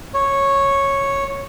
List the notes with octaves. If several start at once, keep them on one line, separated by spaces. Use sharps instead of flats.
C#5